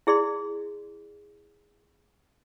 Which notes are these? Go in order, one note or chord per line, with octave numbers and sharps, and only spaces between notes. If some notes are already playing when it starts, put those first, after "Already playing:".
E4 G#4 D5 C6